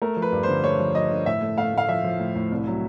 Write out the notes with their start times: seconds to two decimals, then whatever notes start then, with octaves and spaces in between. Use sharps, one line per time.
0.02 A3 A#4
0.17 F3
0.22 B4
0.32 G2
0.43 D3 C5
0.64 A3 C#5
0.79 F3
0.95 F3 D#5
1.10 D3
1.26 A2 E5
1.42 A3
1.57 A3 F5
1.73 A2 F5
1.88 F3 E5
2.04 F3
2.19 A2
2.36 A2
2.51 C2
2.67 F#3